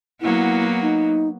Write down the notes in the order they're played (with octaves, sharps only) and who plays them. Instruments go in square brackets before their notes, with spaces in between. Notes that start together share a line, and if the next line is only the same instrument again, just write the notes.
[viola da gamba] F#3 A#3 B3 [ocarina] E4
[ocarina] D#4